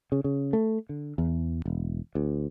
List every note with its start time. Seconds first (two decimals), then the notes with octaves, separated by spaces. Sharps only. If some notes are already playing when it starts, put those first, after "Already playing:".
0.12 C#3
0.24 C#3
0.53 A3
0.89 D3
1.18 E2
1.66 E1
2.15 D2